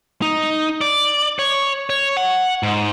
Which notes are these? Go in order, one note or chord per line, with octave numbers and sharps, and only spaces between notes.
D#4
D5
C#5
C#5
F#5
G#2